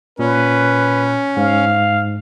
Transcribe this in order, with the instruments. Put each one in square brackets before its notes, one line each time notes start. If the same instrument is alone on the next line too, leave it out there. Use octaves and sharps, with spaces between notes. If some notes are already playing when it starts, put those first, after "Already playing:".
[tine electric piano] A#2 [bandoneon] C#4 [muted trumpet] B4
[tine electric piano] G#2 [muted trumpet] F5